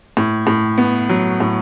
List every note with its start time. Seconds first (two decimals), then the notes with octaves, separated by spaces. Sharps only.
0.17 A2
0.47 A2
0.78 B3
1.09 F#3
1.40 A2